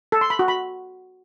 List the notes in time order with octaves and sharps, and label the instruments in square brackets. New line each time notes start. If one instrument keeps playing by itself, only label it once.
[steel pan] A4
C6
B5
F#4
B5